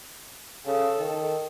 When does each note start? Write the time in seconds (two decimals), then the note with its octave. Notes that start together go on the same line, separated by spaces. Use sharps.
0.66 C#3 A4
0.99 D#3